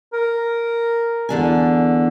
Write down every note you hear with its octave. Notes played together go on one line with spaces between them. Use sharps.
A#4
E2 D3 G#5